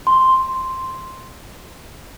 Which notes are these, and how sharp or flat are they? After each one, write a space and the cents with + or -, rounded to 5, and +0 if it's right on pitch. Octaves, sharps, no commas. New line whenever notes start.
C6 +0